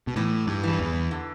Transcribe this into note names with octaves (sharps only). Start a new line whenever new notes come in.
B2
A2 E3
G2
G2 E3
E2
D3